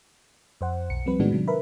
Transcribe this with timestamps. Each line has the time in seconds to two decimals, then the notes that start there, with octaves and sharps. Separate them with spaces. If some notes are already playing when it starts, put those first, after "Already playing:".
0.61 F2 C5 F#5
0.90 B1 C#7
1.06 F3 G3 C4 B4
1.19 A2 D#3 G#3 B3 D4 F#4
1.31 C3 D#3 F#3 D4
1.48 A#4 B4 E5 B5